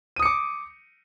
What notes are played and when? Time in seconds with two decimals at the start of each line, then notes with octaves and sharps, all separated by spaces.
0.16 D#7
0.19 D#6
0.22 C#7
0.25 D6